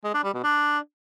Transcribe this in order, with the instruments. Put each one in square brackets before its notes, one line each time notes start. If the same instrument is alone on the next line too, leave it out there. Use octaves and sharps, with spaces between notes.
[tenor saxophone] G#3
D4
G3
B2
D4